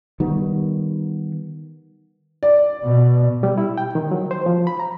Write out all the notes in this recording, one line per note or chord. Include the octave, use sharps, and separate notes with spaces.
D#3 G3 B3
D5
B2
G3
E4
G5
D#3
F#3
C5
F3
B5
A#5